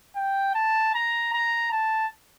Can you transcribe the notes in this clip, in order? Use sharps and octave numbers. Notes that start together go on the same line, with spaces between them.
G5
A5
A#5
A#5
A5